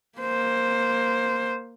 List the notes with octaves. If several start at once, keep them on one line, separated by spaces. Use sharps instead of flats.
A#3 C5